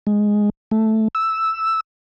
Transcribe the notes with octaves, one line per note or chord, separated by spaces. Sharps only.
G#3
A3
E6